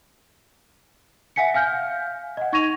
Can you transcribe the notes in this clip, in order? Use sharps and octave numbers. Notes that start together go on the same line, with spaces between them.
E5 F#5 G#5 B6 C#7
F5 G#5 F6 G6
D#5 F#5
D#4 C#6 G#6 A#6 D#7 F7